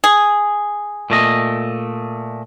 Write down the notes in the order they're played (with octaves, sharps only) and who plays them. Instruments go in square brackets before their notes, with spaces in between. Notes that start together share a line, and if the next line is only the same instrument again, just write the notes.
[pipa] G#4
[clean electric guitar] A#2 A3 D#5